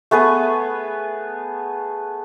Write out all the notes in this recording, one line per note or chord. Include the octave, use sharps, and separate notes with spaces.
A3 B3 G#4 B4